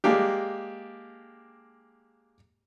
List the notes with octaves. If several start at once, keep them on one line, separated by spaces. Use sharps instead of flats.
G#3 A#3 D4 G4